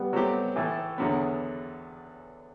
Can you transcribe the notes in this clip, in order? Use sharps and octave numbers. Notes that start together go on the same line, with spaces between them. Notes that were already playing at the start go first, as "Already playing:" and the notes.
Already playing: G3 B3
F#3 A3 C4 G4
A2 E3 A3 E4 A4
E2 D3 F#3 B3